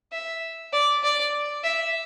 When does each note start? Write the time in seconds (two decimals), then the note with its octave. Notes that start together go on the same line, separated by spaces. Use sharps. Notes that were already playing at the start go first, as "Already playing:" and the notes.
0.12 E5
0.73 D5
1.03 D5
1.64 E5